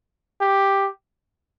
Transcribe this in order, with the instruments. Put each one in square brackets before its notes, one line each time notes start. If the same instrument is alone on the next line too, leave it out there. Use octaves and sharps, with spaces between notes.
[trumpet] G4